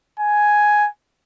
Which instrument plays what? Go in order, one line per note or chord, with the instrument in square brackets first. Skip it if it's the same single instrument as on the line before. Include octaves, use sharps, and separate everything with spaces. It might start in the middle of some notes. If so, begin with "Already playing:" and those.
[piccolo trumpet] G#5